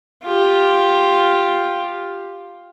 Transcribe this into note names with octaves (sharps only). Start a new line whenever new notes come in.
F4 G4